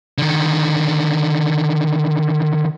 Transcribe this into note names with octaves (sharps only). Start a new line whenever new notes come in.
D3 D#3